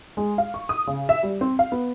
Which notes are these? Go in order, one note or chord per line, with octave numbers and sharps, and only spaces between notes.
G#3
F5
C#6
D#6
C#3
E5
G3
C4
F5
B3